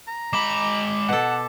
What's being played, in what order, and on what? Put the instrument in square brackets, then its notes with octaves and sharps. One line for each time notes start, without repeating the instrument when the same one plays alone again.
[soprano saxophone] A#5
[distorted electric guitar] G#3 B5 [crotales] D6
[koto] B2 A4 [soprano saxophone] F#5